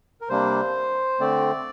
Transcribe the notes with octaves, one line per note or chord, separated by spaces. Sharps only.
A#4
C3 G3 A#3 D4 C5
D3 A3 C4 D5